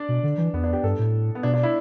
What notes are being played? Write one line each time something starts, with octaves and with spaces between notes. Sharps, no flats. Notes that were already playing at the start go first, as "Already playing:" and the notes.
Already playing: D4 D5
B2
D3
E3
E2 B3
D4
G4
G2 A4
A2
B3
B2 D4
D4
E4